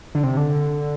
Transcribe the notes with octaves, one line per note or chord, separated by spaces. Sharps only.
D3
C3
D3